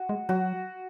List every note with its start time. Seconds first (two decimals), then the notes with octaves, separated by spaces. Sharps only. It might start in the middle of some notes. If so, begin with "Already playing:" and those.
Already playing: F#4
0.09 G#3
0.29 F#3 F#4